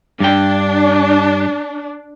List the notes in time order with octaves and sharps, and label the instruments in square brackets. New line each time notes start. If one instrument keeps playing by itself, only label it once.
[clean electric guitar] G2 G5 [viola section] D4